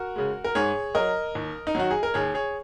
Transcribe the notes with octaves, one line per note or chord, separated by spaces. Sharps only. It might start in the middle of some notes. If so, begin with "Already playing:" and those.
Already playing: F#4 A#4
C#3 G#3
A#4
G#2 G#4 C#5
F#3 A#4 D#5
D#2
D#4
D#3 F#3 F#4
G#4
A#4
D#2 G#4 C#5
G#4 C#5